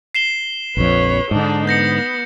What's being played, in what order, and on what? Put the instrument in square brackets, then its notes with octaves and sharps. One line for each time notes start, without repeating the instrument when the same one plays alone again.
[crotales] C7 E7 G7
[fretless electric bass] A#1 F2 [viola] B4 C#5
[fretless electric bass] G#2 D3 [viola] D4 D#4
[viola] B3 [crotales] G6 A#6 C#7